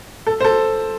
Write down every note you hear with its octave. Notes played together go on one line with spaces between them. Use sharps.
A4
C5
A4